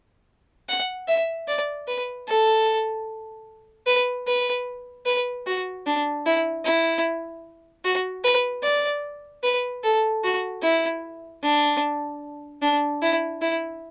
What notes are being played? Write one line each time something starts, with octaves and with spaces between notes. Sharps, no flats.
F#5
E5
D5
B4
A4
B4
B4
B4
F#4
D4
E4
E4
F#4
B4
D5
B4
A4
F#4
E4
D4
D4
E4
E4